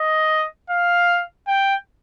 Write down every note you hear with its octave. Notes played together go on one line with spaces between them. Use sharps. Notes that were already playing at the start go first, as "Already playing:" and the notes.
Already playing: D#5
F5
G5